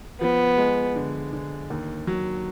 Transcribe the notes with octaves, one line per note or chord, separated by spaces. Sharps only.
F3 B3
G#3
D3
D3
D#2
F#3